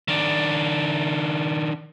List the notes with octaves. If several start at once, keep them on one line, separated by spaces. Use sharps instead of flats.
D#3 D4